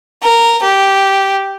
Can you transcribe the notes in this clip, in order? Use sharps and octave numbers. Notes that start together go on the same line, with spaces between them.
A#4
G4